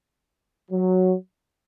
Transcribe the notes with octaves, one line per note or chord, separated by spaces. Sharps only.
F#3